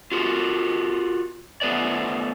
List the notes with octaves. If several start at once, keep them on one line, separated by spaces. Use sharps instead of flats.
F4 F#4 A#4
A3 B3 B4 D5